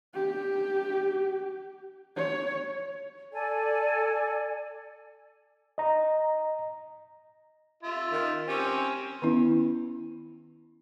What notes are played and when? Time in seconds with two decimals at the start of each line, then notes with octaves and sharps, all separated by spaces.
0.15 G4
2.17 C#5
3.32 A4 D5 G#5
5.78 D#5 A#5
7.83 F4 E5
8.12 D#3
8.48 C4 C#4 G4
9.22 D#3 B3 C#4 E4